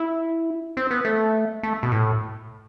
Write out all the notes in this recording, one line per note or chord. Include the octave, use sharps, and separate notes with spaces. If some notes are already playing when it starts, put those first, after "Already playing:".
Already playing: E4
C4
B3
A3
A3
B2
A2